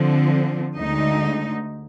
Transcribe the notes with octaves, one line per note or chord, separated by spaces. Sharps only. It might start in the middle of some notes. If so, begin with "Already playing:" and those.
Already playing: D3 F3 C4
D2 D3 G#3 D#4